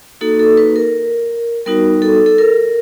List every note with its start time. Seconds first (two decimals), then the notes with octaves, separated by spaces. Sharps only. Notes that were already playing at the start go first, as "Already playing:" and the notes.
0.21 A#3 D#4 F#4 A4
0.39 A4
0.57 B4
0.76 A#4
1.66 G3 B3 D#4 F#4 A#4
2.02 A4
2.26 A4
2.38 A#4